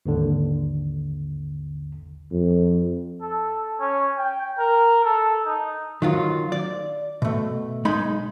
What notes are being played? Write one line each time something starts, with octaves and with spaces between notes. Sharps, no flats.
G#1 D#2 D3
F2
A4
C#4
G5
A#4
A4
D#4
D#3 F#3 F4
D5
B2 A3
B1 G#3 D#4 B5